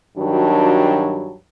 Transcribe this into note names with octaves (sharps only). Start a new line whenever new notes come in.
G2 D#3 F#3 D4 F#4